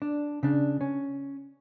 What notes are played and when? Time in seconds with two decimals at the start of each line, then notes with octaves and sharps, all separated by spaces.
0.02 D4
0.43 C#3 D4
0.81 C#4